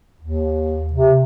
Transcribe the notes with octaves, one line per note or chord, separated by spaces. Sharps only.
D#2
C3